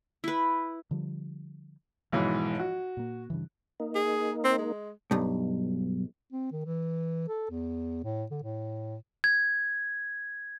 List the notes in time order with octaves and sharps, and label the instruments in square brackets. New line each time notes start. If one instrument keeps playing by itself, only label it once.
[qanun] E4 B4
[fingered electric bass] D3 F3 G3
[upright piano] B1 G#2 E3 [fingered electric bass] F3
[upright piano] F#4
[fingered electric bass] A#2 A#3
G2 C#3 E3
[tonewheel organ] A#3 D#4
[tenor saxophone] G#4
C4
G#3
[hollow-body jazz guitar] B1 G2
[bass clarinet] C4
D#3
E3
A4
E2
A2
D3
A2
[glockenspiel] G#6